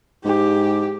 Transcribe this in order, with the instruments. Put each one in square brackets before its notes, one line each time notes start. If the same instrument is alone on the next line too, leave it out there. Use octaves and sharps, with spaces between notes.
[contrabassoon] G#2 [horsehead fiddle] G4